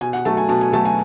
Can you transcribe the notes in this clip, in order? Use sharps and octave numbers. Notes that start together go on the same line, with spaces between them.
B2 G#5
F#5
F#3 A3 A5
G#5
B2 A5
G#5
F#3 A3 A5
G#5